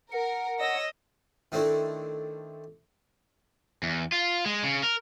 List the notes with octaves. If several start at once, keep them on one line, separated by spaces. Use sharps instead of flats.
A#4 F#5
C#5 D#5 E6 A#6
D#3 A3 C4 D4 E4
E2
F4
G#3
C#3
A#4